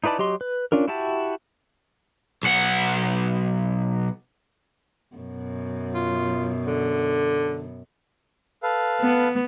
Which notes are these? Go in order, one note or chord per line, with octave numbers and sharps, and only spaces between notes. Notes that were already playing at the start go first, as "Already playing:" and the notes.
D#4 E4 B4 D5 A5
F#3 G4 D#5 C6
B4
C#4 D4 F4 A#4
E4 F#4 G4 E5 A5
B1 F#5
F#2 B2
F4
D3
A4 B4 F5
B3